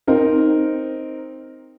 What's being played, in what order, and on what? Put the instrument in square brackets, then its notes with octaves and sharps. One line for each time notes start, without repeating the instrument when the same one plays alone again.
[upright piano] C4 D#4 A#4